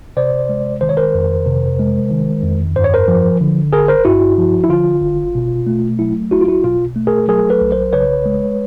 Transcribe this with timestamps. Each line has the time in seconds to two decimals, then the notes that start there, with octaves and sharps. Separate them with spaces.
0.17 C3 C5 D5
0.49 G#3
0.81 D#3 C5
0.89 C#5
0.97 A#4 C5
1.15 F2
1.46 C3
1.79 G#3
2.11 D#3
2.43 F2
2.76 G2 C5
2.84 C#5
2.94 A#4 C5
3.08 F3
3.41 D3
3.73 G1 G#4 A#4
3.88 A#4 C5
4.05 G2 E4 F#4
4.38 F3
4.64 E4
4.69 D3 F4
5.02 G1
5.35 B2
5.67 A3
5.99 F#3 E4
6.31 B1 E4 F#4
6.41 F4
6.48 E4 F#4
6.63 B2 F4
6.96 A3
7.07 G#4 A#4
7.28 F#3 G#4 A#4
7.50 A4 B4
7.62 B1
7.72 A#4 C5
7.93 C#3 B4 C#5
8.26 G#3